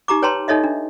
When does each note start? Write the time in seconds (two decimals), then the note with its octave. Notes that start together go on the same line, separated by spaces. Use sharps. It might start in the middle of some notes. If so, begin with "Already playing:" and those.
0.08 D#4 G4 A#5 D6
0.22 B4 C#5 G5 A5 A#5 C6
0.48 D#4 A4 C#5 D#5 E5
0.64 D4